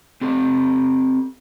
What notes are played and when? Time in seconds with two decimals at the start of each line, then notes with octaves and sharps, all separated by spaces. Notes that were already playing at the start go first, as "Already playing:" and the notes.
0.21 C4 G4 A4